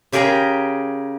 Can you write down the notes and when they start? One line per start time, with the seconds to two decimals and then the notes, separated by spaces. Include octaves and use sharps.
0.12 C#3 G4 G#4 A#4 G5 A#5